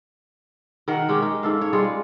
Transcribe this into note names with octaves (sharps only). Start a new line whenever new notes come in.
D#3 F#4 A#4 F#5
G#3 C#4 G4
D#4
G#2 A4 F5
C#5
G3 G#3 F4 G#4